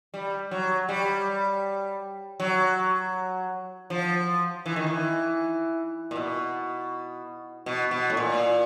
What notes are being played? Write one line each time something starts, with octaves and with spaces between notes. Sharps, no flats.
G3
F#3
G3
F#3
F3
E3
D#3
E3
A#2
B2
B2
B2
A2
A#2